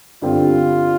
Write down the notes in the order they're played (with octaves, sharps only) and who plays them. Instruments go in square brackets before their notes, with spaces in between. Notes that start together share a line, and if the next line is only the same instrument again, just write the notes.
[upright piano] G2 D3 G3 C4 G4 [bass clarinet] F4